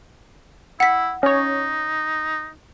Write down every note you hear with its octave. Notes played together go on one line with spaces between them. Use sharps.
E4 F#5 B6
C#4 D#4 C#5